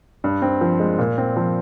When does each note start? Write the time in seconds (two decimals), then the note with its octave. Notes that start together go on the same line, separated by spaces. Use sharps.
0.24 G2
0.42 C4
0.61 F3
0.80 G#3
0.99 A#2
1.18 C4
1.37 F3